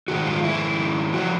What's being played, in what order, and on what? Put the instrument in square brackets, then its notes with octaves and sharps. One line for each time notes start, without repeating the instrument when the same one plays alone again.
[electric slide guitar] G#2 D#3 F#4
F4
E4
F3 A#3 F#4